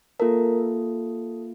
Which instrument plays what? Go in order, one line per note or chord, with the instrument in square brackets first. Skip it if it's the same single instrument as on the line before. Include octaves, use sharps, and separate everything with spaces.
[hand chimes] A#3 F4 A4 A#4